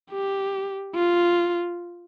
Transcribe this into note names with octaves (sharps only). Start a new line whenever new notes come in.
G4
F4